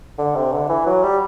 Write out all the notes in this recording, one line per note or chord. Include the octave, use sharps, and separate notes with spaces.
D3
C3
D3
E3
F#3
G3